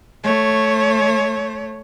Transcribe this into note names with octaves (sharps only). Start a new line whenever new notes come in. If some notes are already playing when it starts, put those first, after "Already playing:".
A3 C#5